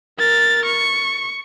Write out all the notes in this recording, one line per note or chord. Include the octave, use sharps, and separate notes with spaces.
A#4 A6
C#6